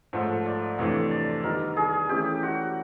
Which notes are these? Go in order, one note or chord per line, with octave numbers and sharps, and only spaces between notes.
G#2 F3 A3 C#5
D5
F2 C3 E3 A3 D4 C#5
D5
D#3 G3 B3 D#4 A#4
G#4
E3 A3 C#4 E4 G4
F#4